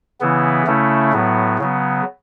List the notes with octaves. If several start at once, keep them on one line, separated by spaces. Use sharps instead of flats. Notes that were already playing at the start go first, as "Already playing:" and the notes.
C#3 E3 B3 E4
C#3 A3 C#4 E4
A2 F#3 B3
C#3 F#3 B3